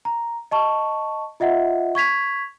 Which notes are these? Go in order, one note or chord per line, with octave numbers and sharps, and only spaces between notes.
A#5
D#5 A5 C#6
F4 D#5 E5 F#5
C#6 G#6 B6 F7